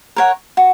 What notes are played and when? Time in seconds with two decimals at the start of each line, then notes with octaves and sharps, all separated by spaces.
0.16 A#4 C#5 F#5
0.57 F#4